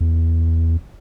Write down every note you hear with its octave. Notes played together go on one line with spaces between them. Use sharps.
E2